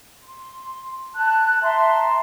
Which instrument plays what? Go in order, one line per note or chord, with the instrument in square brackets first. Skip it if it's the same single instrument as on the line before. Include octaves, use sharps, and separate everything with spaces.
[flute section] C6
A5 F#6
E5 A5 A#5 C6